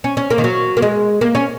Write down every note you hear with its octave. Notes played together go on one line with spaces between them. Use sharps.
C#4
C#4
A#3
D#3
F#3
A#3
G#3
A#3
C#4